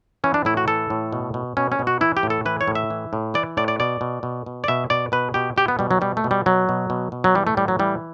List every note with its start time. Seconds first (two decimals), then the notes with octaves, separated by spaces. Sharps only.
0.24 E3 C#4
0.34 D4
0.45 A2 E4
0.57 F#4
0.67 E3 A4
0.90 A2
1.12 B2
1.34 B2
1.57 B2 C#4
1.72 C#4
1.79 B2
1.87 F#4
2.01 E3 E4
2.17 G4
2.23 A2
2.30 A4
2.45 E3 B4
2.61 C#5
2.68 A2
2.75 E5
2.90 E3
3.13 A2
3.34 E3 D5
3.57 A2 D5
3.68 D5
3.80 B2 D5
4.01 B2
4.23 B2
4.46 B2
4.64 D5
4.68 B2 E5
4.90 B2 D5
5.12 B2 B4
5.34 B2 G4
5.56 B2 G4
5.68 B3
5.79 B2 G3
5.91 F#3
6.01 B2 G3
6.17 A3
6.24 B2
6.31 G3
6.46 B2 F#3
6.69 B2
6.90 B2
7.12 B2
7.24 F#3
7.35 E3 G3
7.47 A3
7.57 A2 G3
7.68 F#3
7.79 E3 G3